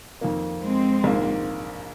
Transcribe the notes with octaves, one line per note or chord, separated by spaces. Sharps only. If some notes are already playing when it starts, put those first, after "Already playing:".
F2 D#3 A#3
G#3 C4
A#1 G#2 D#3 A#3